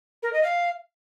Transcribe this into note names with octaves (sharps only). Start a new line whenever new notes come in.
A#4
D#5
F5